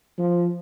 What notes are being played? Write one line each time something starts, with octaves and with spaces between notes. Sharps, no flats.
F3